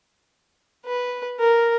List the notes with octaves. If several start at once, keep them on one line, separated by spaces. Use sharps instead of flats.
B4
A#4